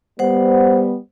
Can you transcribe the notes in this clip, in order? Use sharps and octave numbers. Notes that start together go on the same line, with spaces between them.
G3 B3 C5 F#5